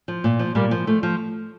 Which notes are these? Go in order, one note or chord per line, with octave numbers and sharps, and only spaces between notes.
F3
A#2
F3
A#2 G3 A#3
F3
F3 A3
F3